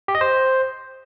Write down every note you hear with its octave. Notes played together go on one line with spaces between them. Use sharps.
G4
D#5
C5